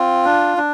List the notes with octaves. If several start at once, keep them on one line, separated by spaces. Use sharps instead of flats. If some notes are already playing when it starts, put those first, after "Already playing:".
Already playing: C4 F4
D4
D4